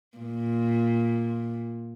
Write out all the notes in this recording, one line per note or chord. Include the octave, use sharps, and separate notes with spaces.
A#2